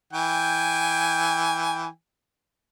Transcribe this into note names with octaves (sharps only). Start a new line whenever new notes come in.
E3 G5 G#5